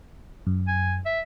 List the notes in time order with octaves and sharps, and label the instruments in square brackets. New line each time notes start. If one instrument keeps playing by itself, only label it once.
[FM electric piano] F#2
[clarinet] G#5
E5